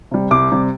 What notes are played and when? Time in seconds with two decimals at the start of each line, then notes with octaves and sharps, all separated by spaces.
0.11 C3 G3
0.31 C2 D6
0.52 C3 G3